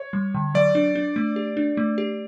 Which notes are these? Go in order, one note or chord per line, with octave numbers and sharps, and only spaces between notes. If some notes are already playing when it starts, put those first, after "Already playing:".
Already playing: C#5
G3
D3
F#3 D5
D4
D4
A3
G4
D4
A3
G4